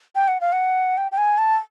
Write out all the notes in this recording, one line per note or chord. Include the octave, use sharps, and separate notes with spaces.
G5
F#5
F5
F#5
G5
G5
G#5
A5